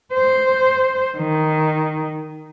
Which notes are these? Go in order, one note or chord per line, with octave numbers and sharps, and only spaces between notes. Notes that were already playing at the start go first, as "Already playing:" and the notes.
C5
D#3